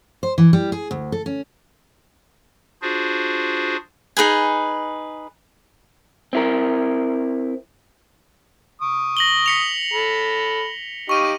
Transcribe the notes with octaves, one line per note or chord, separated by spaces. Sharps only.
C5
E3
G3
G#4
D2
A4
C#4
D4 F4 F#4 G#4 C5
D#4 G#4 B4 G#5
C4 E4 A#4
C#6 D#6
A#6 F#7 G7
B6 C#7 F7
A4 B5
D#4 G4 F5 C#6 D#7